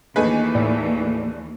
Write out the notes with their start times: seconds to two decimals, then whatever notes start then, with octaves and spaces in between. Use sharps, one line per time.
0.16 D#2 E3 A3 D4 G#4 B4 D#5 G#5
0.55 A2 D5